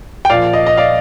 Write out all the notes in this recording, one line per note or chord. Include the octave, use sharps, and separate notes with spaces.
G5
A#2 F3 D5 F5
D#5
D#5
D5 F5